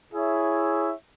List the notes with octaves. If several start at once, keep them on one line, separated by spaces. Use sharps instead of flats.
E4 G#4 C#5 E5